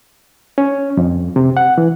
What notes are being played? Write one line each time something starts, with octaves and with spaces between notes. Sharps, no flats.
C#4
F2
C3
F#5
E3